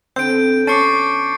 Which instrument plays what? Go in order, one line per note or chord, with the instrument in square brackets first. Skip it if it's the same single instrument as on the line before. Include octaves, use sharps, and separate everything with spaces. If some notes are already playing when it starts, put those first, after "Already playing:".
[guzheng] D3 B3 A4 [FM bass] C4 [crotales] G6 D7
[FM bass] C#4 [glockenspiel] A5 C#6 D6 [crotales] A6 C7 C#7